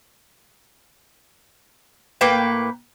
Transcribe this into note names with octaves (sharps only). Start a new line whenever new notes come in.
A2 A#3 B4 G5